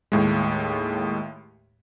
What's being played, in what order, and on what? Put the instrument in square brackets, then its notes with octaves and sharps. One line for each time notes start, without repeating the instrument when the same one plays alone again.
[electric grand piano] D#2 A2 G#3